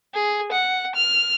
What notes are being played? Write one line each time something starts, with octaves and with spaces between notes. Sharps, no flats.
G#4
F#5
F6